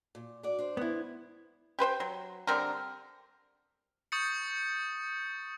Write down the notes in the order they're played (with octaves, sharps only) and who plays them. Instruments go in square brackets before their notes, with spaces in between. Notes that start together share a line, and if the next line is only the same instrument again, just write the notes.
[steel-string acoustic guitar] A#2
D4 F#4 D5
D4 C5
[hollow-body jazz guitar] B3 E4
[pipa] G4 B4 C5 G5
F#3
D3 G3 C4 A#4
[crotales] C#6 D#6 G6 A6 C#7